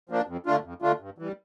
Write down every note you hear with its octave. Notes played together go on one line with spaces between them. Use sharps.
F3 A#3 D4
F2
D3 A3 D4 F4
F2
D3 A3 D4 F4
G2
E3 G3